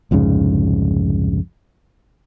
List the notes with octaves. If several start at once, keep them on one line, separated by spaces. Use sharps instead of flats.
C2 F2 G#2 C#3